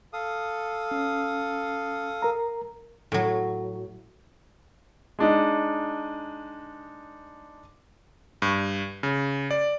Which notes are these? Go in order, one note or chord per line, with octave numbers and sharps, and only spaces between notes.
A4 F5 D#6
C#4
A#4 A#5
A2 F#3
G#3 D4 D#4
G2
C#3
D5